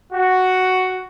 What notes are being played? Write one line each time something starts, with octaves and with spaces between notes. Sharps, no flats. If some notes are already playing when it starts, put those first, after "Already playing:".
F#4